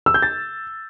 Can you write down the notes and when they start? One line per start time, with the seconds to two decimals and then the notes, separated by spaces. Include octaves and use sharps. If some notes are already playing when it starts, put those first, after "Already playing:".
0.06 E6
0.14 G6
0.22 A6